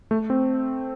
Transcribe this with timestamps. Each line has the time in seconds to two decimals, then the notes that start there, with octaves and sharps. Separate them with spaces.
0.11 A3
0.30 C4